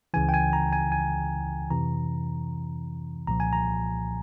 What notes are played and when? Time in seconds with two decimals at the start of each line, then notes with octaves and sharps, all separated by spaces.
0.14 C#2 C#3 E3 G#5
0.29 G5
0.34 G#5
0.53 A#5
0.73 G#5
0.92 G#5
1.71 F2 C3 E3 A#5
3.27 C2 A#2 F3 A#5
3.40 G#5
3.53 A#5